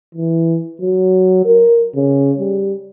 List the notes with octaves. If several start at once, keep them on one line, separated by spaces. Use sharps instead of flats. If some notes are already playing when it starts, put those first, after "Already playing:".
E3
F#3
A#4
C#3
G3